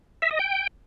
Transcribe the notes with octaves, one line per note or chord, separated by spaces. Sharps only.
E5
D#5
G5